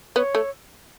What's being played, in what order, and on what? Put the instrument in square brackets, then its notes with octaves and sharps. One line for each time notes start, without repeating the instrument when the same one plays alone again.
[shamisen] B3 [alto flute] C#5
[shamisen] A3